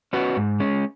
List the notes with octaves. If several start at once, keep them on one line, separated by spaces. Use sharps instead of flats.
C#4 F#4 B4
G#2
G#3 C#4